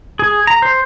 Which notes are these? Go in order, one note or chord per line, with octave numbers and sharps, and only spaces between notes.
G#4
A#5
C5